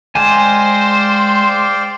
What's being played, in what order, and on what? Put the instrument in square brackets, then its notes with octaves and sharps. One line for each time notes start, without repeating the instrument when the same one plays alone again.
[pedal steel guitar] G#3 G#5 [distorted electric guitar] C5 [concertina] D5 F5 G5